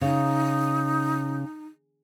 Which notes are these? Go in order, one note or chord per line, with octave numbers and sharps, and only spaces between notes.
C#3 D#4